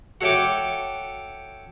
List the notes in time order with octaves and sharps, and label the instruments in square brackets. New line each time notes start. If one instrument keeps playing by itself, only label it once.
[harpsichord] F#4 A4 C#5 E5 G5 D6